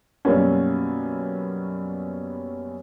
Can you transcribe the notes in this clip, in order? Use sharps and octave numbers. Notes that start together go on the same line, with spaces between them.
F#2 B2 G3 A#3 B3 C#4